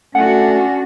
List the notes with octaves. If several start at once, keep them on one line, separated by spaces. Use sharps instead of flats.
A3 C#4 D4 F#4 F#5